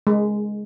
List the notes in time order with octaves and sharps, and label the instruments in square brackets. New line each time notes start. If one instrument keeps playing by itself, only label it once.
[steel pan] G#3